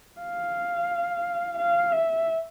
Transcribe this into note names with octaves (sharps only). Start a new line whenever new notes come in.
F5
F5
E5